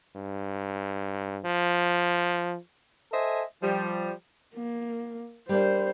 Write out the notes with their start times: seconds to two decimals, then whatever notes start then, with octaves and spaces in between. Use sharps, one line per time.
0.16 G2
1.45 F3
3.12 A4 C5 D#5 E5 G#5
3.62 F3 G3
4.55 A#3
5.49 G3 A#3 D4 C5